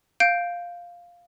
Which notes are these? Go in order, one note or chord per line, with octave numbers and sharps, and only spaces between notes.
F5 G6 D7